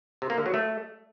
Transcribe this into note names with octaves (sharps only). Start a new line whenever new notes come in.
C3
A#3
D3
F#3
A3